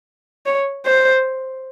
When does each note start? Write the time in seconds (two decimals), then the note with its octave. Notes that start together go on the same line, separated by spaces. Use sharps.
0.46 C#5
0.85 C5